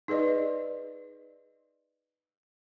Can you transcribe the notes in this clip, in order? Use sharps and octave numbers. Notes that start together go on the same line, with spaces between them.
D#4 G#4 B4 D5 D#5